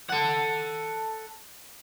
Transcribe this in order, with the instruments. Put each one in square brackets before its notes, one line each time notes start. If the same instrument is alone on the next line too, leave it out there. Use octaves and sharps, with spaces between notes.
[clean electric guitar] A4 F#5